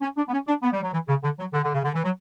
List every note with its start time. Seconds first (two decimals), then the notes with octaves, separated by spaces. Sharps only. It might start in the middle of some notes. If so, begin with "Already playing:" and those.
0.02 C#4
0.17 D4
0.28 B3
0.32 C#4
0.47 D4
0.63 B3
0.73 G3
0.82 F#3
0.92 E3
1.08 C#3
1.23 D3
1.39 F#3
1.53 D3
1.63 D3
1.74 C#3
1.84 D3
1.94 E3
2.04 F#3